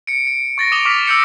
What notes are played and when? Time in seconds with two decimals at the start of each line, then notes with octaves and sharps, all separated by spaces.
0.07 C#7 D7
0.27 D7
0.58 C#6 A6 A#6
0.72 D6 D#6 D7 F7 G7
0.85 C#6 D6 F6 B6
1.07 E6 G6 C#7